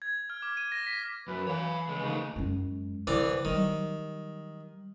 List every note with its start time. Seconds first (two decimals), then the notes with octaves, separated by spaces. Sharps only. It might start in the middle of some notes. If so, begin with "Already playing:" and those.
0.02 G#6
0.30 F6
0.42 D6
0.57 D#7
0.72 A#6
0.87 B6
1.28 F#2 B4
1.47 E3 C#5 F5
1.89 C#2 G#3
2.02 D2 C#3 D#4
2.36 F#2 G#3
3.07 C2 D3 E3 D5
3.45 D#3 F#3 G3